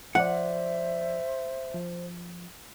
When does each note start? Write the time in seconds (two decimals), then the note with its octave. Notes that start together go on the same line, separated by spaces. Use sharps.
0.15 F3 C5 D5 E5 F#5
1.74 F3